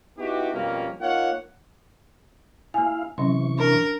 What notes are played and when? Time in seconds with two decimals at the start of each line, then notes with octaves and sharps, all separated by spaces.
0.18 B3 D#4 E4 F#4 G4
0.54 F2 B2 G3 A#3 C4 C#4
1.01 A#3 D#4 F4 C#5 F#5
2.74 A#3 E4 F5 G#5
3.18 C3 E3 F#3 C#4 C6 C#6
3.59 D4 A#4